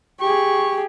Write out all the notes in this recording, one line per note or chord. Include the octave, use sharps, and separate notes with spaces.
G4 G#4 C#6